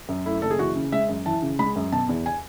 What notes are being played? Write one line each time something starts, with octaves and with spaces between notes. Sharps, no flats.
F#2
A3 E4
F#1 A4
G#4
E3 F#4
C#3
G#3 E5
F#2
E3 A5
C#3
G#3 B5
F#2
B2 A5
E2
G#5